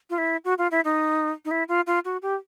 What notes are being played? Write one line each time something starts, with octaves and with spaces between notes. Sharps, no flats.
F4
E4
F#4
F4
E4
D#4
D#4
E4
F4
F4
F#4
G4